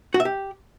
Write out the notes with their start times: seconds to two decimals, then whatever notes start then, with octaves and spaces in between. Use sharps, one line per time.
0.14 F#4
0.20 E5
0.25 G4